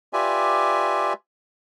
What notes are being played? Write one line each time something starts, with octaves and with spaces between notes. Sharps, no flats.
F4 G4 B4 D5 E5 G#5